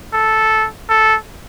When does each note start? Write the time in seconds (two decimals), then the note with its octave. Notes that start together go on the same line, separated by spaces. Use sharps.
0.13 A4
0.89 A4